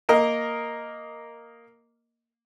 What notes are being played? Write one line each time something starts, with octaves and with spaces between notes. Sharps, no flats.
A#3 A#4 D#5